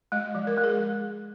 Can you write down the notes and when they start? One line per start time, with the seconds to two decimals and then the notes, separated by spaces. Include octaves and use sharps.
0.12 G#3 D#5
0.35 F3
0.47 A#4
0.57 G#3
0.64 G#4